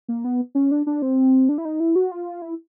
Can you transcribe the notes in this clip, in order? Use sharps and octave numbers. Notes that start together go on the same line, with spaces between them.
A#3
B3
C#4
D4
D4
C4
D4
E4
D#4
E4
F#4
F4
E4